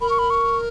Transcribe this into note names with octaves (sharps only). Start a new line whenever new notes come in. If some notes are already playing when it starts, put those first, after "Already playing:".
A#4 B5
C#6
B5
C#6